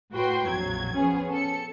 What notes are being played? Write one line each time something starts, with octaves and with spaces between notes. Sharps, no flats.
A2 F#4 B4 G5 C6
A#1 F2 F#3 G#6
F3 B3 C#4 G#4
A4 C#7